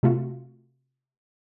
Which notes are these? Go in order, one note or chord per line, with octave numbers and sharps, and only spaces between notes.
C3 A3 F4 F#4